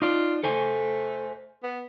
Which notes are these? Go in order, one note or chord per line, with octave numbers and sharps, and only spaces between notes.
D#4 F4 D5
A3 A4 C5 G#5
B3